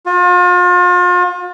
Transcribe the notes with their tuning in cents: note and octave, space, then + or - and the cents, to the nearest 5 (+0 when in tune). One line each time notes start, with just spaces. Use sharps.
F4 +40